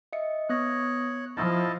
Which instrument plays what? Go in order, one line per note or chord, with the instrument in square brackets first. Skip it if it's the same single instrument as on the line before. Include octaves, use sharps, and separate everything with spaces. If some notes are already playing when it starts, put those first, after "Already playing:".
[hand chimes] D#5 E5 C#7
[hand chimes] B3 D#6 A#6 [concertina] C#5 F#6
[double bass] F3 [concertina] E4 D#5 A5 [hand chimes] E6 F6 A6